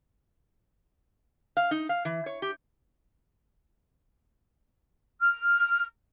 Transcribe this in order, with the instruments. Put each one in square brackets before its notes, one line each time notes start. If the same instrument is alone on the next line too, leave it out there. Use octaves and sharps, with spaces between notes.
[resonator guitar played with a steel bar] F5
D#4
F5
E3
C#5
G4
[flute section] F6